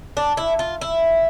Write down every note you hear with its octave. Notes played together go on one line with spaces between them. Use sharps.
D4
E4
F4
E4